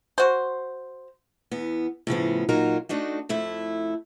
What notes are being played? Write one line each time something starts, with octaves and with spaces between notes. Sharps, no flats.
F#4 C5
E2 B3
A2 C#3 F3 B3
A#2 F#3 D#4 F4 F#4 A#4
A3 D4 D#4 F#4
F2 A3 E4